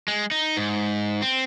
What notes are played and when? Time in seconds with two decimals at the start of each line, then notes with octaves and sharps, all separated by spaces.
0.08 G#3
0.31 D#4
0.57 G#2
1.22 C4